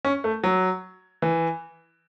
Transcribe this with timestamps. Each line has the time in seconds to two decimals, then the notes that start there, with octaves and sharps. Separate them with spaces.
0.05 C#4
0.24 A3
0.44 F#3
1.22 E3